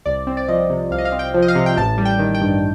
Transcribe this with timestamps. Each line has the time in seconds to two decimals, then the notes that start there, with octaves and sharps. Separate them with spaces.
0.06 C2 D5
0.27 C4
0.37 D5
0.48 F3 D#5
0.70 C3
0.91 C2 F5
0.98 D#5
1.05 F5
1.12 C4
1.19 G5
1.34 F3
1.42 D#5
1.48 F5
1.55 C3
1.66 G5
1.77 A1 A5
1.98 G3
2.05 G5
2.19 D#3
2.35 G5
2.41 G2